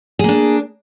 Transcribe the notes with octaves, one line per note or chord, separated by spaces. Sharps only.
A#3 D4 G#4